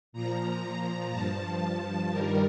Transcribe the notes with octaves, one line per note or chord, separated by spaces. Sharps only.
A#2 F3 A#5
G2 F3 A5
A5
G2 D#3 G3 A#4